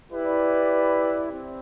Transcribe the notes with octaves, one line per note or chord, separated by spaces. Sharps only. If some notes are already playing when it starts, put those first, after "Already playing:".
E4 G4 B4 D5
C4